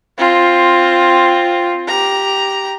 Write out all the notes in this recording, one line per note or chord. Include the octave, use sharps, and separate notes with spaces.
C4 F4
G4 A#5